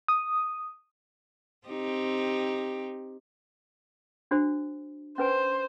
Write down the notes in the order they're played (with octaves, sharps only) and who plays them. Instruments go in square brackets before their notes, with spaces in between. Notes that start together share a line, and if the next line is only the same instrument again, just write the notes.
[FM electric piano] D#6
[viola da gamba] C4 D#4 G4
[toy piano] D4 F#4 C5
[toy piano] C#4 B4 G#5 [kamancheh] C5